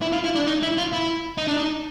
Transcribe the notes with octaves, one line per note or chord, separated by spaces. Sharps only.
E4
F4
E4
D4
D#4
E4
F4
E4
D#4
D4
D#4